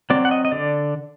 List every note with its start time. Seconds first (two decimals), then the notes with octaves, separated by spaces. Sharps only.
0.10 F#3 C4 D5
0.25 F#5
0.31 D#5
0.45 D#5
0.52 D3 D5